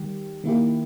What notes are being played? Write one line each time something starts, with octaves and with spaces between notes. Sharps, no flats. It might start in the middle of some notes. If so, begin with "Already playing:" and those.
Already playing: D#3 G3 G4
D#3 A#3 E4 G4